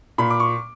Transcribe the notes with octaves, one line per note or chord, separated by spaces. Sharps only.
A#2 B5
D6
C#6